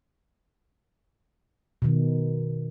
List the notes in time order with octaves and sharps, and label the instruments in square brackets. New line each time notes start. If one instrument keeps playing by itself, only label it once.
[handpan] B2 D#3